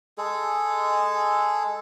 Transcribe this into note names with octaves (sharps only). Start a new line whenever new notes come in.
G#3 G#4 A4